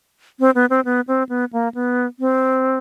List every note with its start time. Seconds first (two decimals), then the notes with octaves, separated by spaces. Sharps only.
0.40 C4
0.55 B3
0.70 C4
0.85 B3
1.08 C4
1.29 B3
1.53 A#3
1.75 B3
2.20 C4